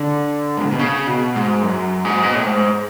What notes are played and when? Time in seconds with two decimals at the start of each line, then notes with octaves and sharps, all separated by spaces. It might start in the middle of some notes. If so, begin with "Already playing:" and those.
Already playing: D3
0.57 G#2
0.64 A2
0.72 B2
0.79 C#3
1.07 B2
1.36 G#2
1.63 F#2
2.05 G#2
2.23 B2
2.35 A2
2.46 G#2